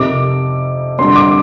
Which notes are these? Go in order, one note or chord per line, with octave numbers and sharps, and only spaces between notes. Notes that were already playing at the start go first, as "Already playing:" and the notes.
Already playing: F2 C3 D#3 D6
F2 D3 G3 C6
D6